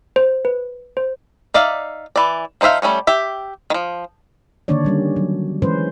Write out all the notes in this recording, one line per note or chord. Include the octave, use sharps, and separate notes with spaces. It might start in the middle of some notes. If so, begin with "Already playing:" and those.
C5
B4
C5
D#4 D5 E5 F5
E3 D5
F3 D#4 C5 E5 F5
G3 A3 C#4 C#5
G4 E5
D#3 F3
D3 D#3 A#3 D4 C#5 D5
D#3 G3 C#4
F#3
E3 G#3 C#4 B4 C5